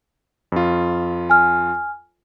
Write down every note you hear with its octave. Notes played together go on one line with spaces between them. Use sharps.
F2 F4
G#5 F6